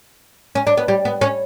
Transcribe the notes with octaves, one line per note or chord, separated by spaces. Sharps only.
C#4
D4
B3
G3
B3
C#4